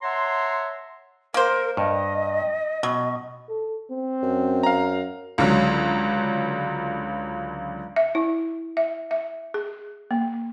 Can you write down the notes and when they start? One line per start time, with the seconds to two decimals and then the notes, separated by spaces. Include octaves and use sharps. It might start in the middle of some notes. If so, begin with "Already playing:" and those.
0.03 C#5 E5 F#5 A5 A#5 C6
1.34 A#3 A#4 C5
1.77 G2 D#5
2.83 B2 F#3
3.49 A4
3.91 C4
4.23 F#2
4.63 F5 A#5
5.38 C#2 D3 F#3
7.96 E5
8.15 E4
8.77 E5
9.11 E5
9.54 G#4
10.11 A#3